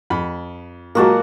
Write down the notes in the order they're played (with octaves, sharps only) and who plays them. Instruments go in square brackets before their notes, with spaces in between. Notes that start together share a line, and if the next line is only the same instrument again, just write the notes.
[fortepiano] F2 B5
[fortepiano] A#2 F#3 G#3 [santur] A#3 F#4 A5